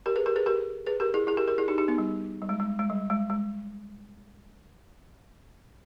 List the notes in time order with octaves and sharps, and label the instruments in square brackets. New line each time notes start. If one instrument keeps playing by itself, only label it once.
[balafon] G4 A#4
G#4 B4
G4 A#4
G#4 B4
G4 A#4
G#4 B4
G4 A#4
E4 G#4
E4 G#4
G4 A#4
G4 A#4
E4 G#4
D#4 G4
D#4 G4
B3 D#4
G3
G3
G#3
G#3
G#3
G3
G#3
G#3